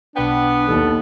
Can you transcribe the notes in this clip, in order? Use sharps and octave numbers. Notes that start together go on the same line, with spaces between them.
B1 B3 D4 B4 G5
D#2 A4